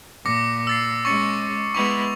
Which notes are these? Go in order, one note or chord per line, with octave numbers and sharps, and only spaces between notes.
A#2 D6 A#6 C#7
E6 A6 C7
G#3 C#4 C#6 A6 C#7
G#3 B3 E4 C#6 F7